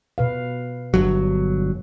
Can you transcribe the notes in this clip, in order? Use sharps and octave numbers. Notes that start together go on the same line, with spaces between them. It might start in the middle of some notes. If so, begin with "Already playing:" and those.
B2 B4 F5
G1 F#3